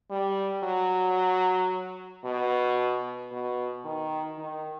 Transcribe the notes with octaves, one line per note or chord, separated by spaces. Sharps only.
G3
F#3
B2
B2
D#3
D#3